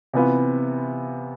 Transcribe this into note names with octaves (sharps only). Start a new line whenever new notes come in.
C3 E3 B3 F4